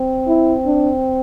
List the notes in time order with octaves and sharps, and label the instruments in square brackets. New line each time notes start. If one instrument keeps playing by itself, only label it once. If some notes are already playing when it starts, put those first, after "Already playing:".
Already playing: [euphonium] C4
[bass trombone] E4
D4